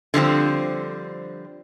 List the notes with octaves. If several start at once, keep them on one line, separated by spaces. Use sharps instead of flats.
D3 F3 G3 C4